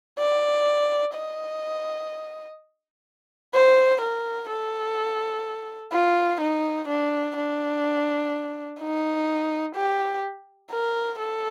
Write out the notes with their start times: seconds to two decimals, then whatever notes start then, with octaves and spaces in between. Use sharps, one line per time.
0.18 D5
1.14 D#5
3.54 C5
4.00 A#4
4.49 A4
5.92 F4
6.40 D#4
6.88 D4
7.36 D4
8.79 D#4
9.75 G4
10.71 A#4
11.19 A4